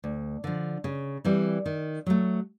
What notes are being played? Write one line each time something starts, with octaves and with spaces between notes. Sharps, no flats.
D2
D3 F3
C#3
E3 G3 C4
D#3
F#3 A3